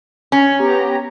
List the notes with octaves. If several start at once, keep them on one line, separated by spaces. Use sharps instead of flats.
C#4
B3 G4 A#5